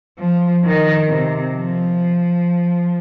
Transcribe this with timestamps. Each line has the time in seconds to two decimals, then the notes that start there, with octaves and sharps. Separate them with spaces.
0.20 F3
0.65 D#3
1.09 C3
1.54 F3